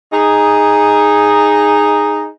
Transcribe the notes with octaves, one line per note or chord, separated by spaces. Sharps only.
D#4 G#4